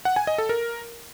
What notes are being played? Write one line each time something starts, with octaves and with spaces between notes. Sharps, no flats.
F#5
G#5
D#5
A4
A#4